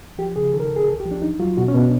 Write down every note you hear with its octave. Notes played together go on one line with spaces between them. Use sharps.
F3 G4
C#3 G#4
D#3 A4
A#4
A4
D#2
G#4
C2 A4
G4
F3
D4
D#2 D#4
F#3 F4
B2 F#4
C#4
B2
D4